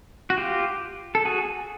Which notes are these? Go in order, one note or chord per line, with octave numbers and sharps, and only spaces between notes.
F#4
F4 G4
A4
F#4 G#4